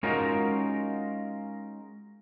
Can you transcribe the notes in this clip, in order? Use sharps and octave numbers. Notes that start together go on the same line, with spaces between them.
G#3 C#4 D#4 F4 F#4 A#4